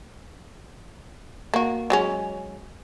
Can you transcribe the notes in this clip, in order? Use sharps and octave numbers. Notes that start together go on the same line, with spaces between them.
A#3 F#4
F#3 G#3 C#4